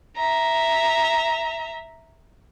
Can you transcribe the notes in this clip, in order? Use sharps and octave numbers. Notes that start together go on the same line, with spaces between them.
E5 A#5